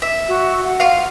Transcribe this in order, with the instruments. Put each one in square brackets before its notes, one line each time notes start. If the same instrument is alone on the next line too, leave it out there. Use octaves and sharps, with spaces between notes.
[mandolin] E5
[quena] F#4
F#5
[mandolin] F4 F5